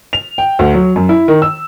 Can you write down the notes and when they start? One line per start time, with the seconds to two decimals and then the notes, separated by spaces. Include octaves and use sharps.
0.13 F7
0.38 G5
0.59 D2
0.74 F#3
0.96 F#2
1.09 E4
1.28 D#3
1.42 E6